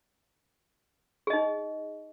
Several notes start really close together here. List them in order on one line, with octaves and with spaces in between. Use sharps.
G#4 D#5 D#4